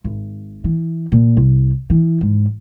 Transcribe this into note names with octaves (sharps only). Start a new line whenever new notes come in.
G#1
E3
A#2
C2
E3
G#2